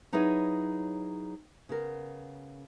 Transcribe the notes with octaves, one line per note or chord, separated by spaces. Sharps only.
F#3 D#4 E4 G#4 B4 C#5
C#3 B3 A#4